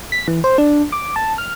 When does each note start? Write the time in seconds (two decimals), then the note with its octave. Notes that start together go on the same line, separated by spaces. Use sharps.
0.12 B6
0.28 E3
0.44 C5
0.58 D4
0.92 D6
1.16 A5
1.38 F6